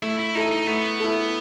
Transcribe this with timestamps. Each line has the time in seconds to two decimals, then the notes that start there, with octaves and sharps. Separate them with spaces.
0.02 A3 E4
0.19 E4
0.35 D#4 E4 A4
0.51 D#4
0.67 A3 B3
1.00 E4 A4